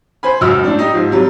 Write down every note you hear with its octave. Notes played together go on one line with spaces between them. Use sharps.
C5 G#5 B5
C#2 F#2 F#4 E6 F6
A2 D4
D#4 G4
G#2 F3
C3 F#3 G3